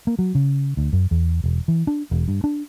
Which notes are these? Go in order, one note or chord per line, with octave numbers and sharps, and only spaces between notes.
A#3
F#3
C#3
D2
F#2
E2
E1
E3
D4
E1
G2
D4